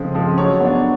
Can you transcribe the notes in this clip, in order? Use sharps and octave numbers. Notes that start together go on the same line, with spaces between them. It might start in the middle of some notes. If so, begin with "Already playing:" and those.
Already playing: C#3 F3 G#3 C4
F3 G#3 C4
F#3 C#5
B3 D4